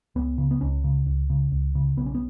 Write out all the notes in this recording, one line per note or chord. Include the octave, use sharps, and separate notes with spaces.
C#2 B3
C#3
B3
C#2 C#4
C#3
C#2
C#3
C#2
C#3
B1 B3
C#4
B3